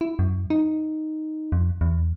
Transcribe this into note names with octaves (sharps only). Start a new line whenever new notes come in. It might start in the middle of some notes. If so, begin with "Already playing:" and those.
E4
F#2
D#4
F2
E2